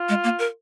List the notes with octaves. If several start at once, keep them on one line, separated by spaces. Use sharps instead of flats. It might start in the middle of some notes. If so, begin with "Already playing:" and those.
Already playing: F4
G#3
A#3
A#4